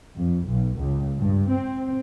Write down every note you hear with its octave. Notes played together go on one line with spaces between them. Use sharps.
F2
B1
C#2
G2
C4